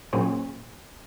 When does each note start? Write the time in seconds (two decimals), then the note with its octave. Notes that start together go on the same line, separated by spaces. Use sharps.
0.13 A#2 F#3 A#3 C#4 G#4 C5